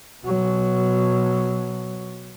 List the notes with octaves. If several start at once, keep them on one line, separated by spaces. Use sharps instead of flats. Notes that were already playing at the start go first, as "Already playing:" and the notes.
B2 F#3